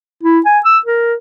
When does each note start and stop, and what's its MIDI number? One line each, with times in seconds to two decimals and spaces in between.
0.23 0.40 64
0.46 0.59 80
0.65 0.79 88
0.86 1.14 70